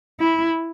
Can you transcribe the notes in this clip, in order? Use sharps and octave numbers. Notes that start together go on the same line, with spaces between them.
E4